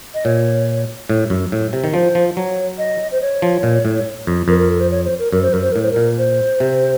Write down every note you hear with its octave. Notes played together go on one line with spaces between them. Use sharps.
D#5
A#2 C#5
A2
F#2
A2
C3
D#3
F3 C5
F3
F#3 C#5
D#5
C5
C#5
F3
A#2
A2
F2
F2 A#4
A#4
A4
C5
C#5
C5
A#4
F#2 A#4
C5
F#2 A#4
C5
A2 A#4
C5
A#2 A#4
C5
C3